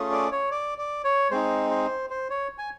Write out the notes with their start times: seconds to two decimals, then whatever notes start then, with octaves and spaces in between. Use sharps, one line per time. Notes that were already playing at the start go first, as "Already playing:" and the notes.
Already playing: A3 C#4 F4 G#4
0.12 D5
0.32 C#5
0.51 D5
0.78 D5
1.04 C#5
1.31 G#3 C4 D#4 C5
1.70 C5
2.10 C5
2.30 C#5
2.58 G#5